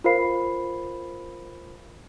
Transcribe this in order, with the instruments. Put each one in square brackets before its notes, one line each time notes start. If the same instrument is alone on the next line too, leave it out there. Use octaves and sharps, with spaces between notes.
[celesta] F4 A#4 C5 F5 B5 C7